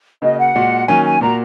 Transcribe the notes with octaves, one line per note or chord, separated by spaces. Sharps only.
C#3 A#3 F#4 D#5
F#5
A#2 G#3 F#4
D#3 F#3 A#3 C#4 G#5
G#5
A#2 A#3 F#4 A#5